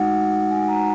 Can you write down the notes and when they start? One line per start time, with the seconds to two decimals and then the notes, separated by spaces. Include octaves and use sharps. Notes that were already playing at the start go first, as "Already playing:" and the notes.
Already playing: G#3 D#4 F#4 F#5
0.51 G#5
0.68 A#5